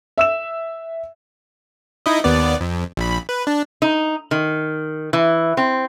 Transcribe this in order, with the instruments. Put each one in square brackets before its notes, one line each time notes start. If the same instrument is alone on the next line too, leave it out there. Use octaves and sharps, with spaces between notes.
[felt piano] E5 E6 E7
[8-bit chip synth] D#4 E4 D#5
D#2 B3 D5
F2
A#1 B5
B4
D4
[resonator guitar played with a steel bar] D#4
D#3
E3
C4